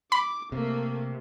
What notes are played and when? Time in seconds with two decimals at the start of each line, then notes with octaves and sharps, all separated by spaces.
0.12 B5 D6
0.52 C3 A3 A#3